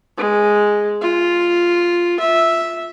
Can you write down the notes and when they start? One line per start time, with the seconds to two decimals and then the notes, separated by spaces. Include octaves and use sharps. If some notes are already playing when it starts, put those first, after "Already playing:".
0.17 G#3
1.02 F4
2.20 E5